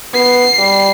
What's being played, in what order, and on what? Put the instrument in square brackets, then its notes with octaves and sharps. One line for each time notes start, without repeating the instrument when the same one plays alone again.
[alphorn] B3 [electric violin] C7
[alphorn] G3